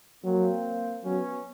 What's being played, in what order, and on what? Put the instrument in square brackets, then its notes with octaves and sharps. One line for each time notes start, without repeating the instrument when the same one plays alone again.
[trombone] F#3 [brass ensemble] A#3 C4
[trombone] F#3 [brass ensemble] B3 C#4